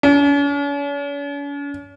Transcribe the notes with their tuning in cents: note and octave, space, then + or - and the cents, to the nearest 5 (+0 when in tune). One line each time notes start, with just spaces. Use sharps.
C#4 +45